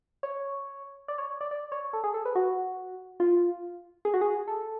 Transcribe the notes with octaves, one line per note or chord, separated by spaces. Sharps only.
C#5
D5
C#5
D5
D5
C#5
A4
G#4
A4
B4
F#4
F4
G#4
F#4
G#4
A4